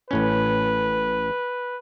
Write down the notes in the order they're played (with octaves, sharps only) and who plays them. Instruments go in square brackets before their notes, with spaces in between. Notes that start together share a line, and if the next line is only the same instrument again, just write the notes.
[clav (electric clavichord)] A1 A2 C#4 [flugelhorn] B4